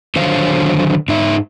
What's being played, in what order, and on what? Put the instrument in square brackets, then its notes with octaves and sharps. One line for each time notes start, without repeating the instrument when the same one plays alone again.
[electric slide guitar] D3 D#3 F#3 C5 C#5 F5
G#2 D#4 E5